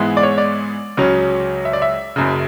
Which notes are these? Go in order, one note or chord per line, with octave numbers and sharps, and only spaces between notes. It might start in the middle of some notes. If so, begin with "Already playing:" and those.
Already playing: G#2 E3 G#3 B3 E4
D5
C#5
D5
C#2 C#3 F#3 C#4
E5
D5
E5
F#1 F#2 C#3